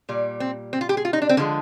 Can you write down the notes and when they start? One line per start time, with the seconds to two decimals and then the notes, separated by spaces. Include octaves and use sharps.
0.09 A#2 G3
0.40 C4
0.73 C4
0.81 F4
0.89 G4
0.97 G#4
1.05 F4
1.13 D#4
1.22 D4
1.29 C4
1.37 D3 F3 G#3 A#3